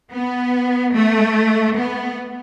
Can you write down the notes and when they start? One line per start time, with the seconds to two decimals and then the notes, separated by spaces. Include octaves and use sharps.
0.13 B3
0.95 A3
1.77 B3